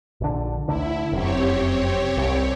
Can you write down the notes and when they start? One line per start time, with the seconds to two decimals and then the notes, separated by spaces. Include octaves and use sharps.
0.21 A#1 D3
0.68 D2 D3 E4
1.12 F1 F#2 C4 G4 C#5
2.17 C2